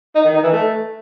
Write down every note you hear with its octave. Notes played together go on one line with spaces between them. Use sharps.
D#4
D#3
D#4
E3
A3